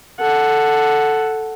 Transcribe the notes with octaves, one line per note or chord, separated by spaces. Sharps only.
A4 F#5